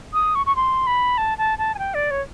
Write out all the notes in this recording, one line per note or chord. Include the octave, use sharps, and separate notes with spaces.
D#6
C#6
C#6
C6
B5
A5
A5
A5
G#5
G5
D5
C#5